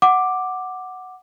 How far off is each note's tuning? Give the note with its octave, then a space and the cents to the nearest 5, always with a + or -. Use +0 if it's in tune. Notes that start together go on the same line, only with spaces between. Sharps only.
F#5 +0 D6 +5